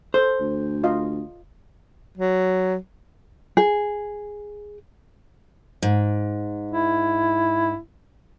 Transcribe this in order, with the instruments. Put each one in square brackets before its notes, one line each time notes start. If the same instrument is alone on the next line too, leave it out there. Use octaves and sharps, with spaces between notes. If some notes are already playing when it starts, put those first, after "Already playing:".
[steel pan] A4 [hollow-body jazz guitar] C5
[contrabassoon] D2
[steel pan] F4 D#5 F5
[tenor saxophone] F#3
[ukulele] G#4
[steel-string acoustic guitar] G#2
[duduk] E4